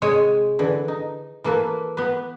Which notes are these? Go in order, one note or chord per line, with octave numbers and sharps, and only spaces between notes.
C3 G#3 C#5 G5 G#5
D3 E3
D#4
E3 A#3 A4 B4
B3 G4 B4